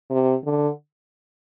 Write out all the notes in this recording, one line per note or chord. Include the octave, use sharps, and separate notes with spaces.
C3
D3